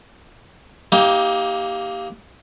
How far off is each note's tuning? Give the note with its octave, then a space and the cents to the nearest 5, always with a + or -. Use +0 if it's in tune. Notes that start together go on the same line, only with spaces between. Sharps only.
A#3 +0 D#4 +30 G4 +0